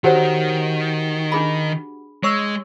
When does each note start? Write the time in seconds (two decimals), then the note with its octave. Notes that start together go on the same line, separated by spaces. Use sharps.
0.04 D#3 F#4 G4 A#4 C5 C#5 F#5
1.32 D4 G#4 B5
2.23 G#3 C#5 C#6 E6